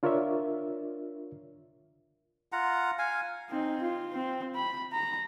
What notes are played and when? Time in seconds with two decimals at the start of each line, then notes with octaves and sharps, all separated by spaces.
0.03 D4 F4 A#4 C#5 D5 E5
2.52 F4 F#5 A#5
2.99 F5 G#5
3.50 C4 D#4
3.82 F4
4.13 C4
4.56 B5
4.93 A#5